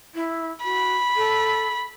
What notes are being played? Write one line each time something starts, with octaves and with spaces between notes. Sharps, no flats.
E4
F#4 B5
A4